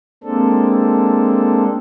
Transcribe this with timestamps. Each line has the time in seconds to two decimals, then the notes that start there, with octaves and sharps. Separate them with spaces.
0.24 G#3 A#3 C4 D4 A4